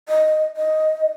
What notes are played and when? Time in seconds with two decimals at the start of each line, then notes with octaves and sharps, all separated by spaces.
0.09 D#5
0.57 D#5